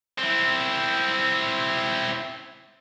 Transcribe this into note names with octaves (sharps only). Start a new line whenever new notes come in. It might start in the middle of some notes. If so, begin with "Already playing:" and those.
C4 E4